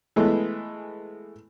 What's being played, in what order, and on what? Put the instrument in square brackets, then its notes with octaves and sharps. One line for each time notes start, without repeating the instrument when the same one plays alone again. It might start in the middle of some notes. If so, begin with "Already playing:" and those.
[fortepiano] E3 G#3 A3 B3